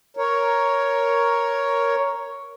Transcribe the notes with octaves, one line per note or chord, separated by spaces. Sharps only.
A#4 C#5